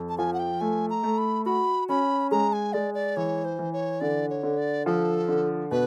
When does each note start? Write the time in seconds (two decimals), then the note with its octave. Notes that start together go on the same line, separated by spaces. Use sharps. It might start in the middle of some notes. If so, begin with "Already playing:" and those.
Already playing: F2
0.09 A5
0.18 F3 G#5
0.33 F#5
0.39 G5
0.61 A3 G#5
0.90 A#5
1.03 A3
1.18 B5
1.46 F#4 B5
1.89 C#4 B5
2.31 G#3 A#5
2.53 G#5
2.73 G#3 D5
2.94 D5
3.16 E3 C#5
3.45 C5
3.59 E3
3.73 C#5
4.01 D3 D5
4.30 C#5
4.43 D3
4.58 D5
4.86 F3 A4
5.28 D3
5.71 B2 B4